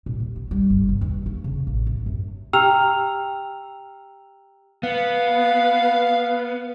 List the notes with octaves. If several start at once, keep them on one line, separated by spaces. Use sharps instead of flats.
A#2
D#2
B3
G3
G1
C#3
E2
A#3
C#3
A1
F#2
F#2
G4 G5 A#5 E6 F6 F7
B3 F5